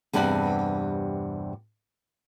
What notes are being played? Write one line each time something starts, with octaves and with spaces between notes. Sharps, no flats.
E2 G2 C3 B4 D5 F#5